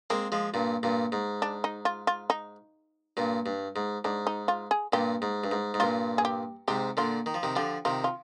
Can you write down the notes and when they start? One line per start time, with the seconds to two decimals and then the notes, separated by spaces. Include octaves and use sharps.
0.10 G#3 A#3 C4
0.32 F3 G#3
0.54 G2 A#2
0.83 G2 A#2
1.12 G#2
1.42 D4
1.64 D#4
1.85 F4
2.07 F4
2.30 D#4
3.17 G2 A#2
3.46 G2
3.76 G#2
4.05 G#2 D4
4.27 D#4
4.48 F4
4.71 G#4
4.93 G2 A#2 G4
5.22 G#2
5.44 G2
5.51 G#2
5.74 G#2
5.80 G2 A#2 F4
6.18 G#4
6.25 G4
6.68 G#2 C3 G4
6.97 A#2 D3 F4
7.26 D#3
7.34 F3
7.43 C3 D#3
7.56 D3 F3 G4
7.85 C3 D#3 F4
8.04 F4